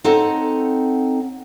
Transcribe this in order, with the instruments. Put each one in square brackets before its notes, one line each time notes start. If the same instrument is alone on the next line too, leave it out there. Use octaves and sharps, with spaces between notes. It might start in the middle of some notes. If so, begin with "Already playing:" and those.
[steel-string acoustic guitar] C4 D#4 A4 C#5 F#5